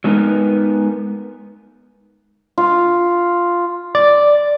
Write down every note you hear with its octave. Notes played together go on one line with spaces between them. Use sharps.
F#3 G#3 B3 D#4 A#4 B4
F4
D5